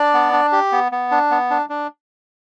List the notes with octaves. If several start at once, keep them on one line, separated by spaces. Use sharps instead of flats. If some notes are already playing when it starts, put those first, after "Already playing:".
Already playing: D4 D5
B3
D4
G4
B3
B3
D4
B3
D4
D4